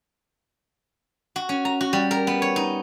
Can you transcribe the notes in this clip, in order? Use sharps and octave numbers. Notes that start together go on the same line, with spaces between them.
F#4
C#4
A#5
F#4
G3
A#4
B3
C#5
D#4